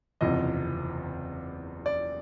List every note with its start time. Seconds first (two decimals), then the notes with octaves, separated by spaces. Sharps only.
0.21 F#1 E2 C3 F3 D#5
1.86 D5